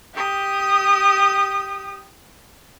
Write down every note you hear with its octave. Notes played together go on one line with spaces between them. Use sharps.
G4 D#6